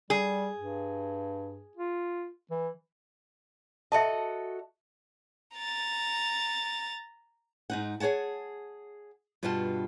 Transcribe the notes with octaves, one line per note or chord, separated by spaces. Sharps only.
G3 G#4
G2
F4
E3
F#4 A4 D#5 E5 A5
A#5 A6
G#2 D#4 F#5
G#4 A4 C#5 F#5 A5
G2 B2 G3 F4 F#5 A5